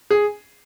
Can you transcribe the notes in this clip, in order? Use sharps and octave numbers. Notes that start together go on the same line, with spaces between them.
G#4